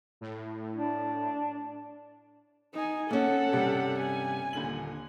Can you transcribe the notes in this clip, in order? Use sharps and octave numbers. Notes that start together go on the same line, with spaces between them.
A2
D4
D#4 G#5
A#3 C#4 A4 F#5
G2 C3 G3
G#5
D#1 D3 F#7